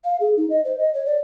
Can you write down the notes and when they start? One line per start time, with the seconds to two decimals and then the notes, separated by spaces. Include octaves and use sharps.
0.04 F5
0.20 G#4
0.37 D#4
0.50 D#5
0.65 C5
0.78 D#5
0.94 C#5
1.06 D5